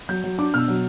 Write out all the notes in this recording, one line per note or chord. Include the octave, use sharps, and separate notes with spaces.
F#3 G6
F#3
D4 D6
B2 E6 F6
F#3